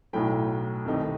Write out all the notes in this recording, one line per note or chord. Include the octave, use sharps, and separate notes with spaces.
B1 A2 F#3 A3 G5 B5
C2 C3 D#3 A3 D#4